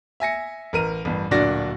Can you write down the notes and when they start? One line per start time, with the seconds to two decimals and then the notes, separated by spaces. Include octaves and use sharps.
0.20 E5 G#5 A#6 C#7
0.73 A1 A#4 D#7
1.05 A1 G2
1.31 D1 A#2 D4 F#4 D5 A#6